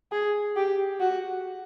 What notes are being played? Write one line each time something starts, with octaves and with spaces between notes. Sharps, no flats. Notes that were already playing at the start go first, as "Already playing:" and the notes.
G#4
G4
F#4